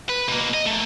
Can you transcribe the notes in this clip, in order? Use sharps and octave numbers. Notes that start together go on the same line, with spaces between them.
B4
B2 A#3
D#5
A3 A#3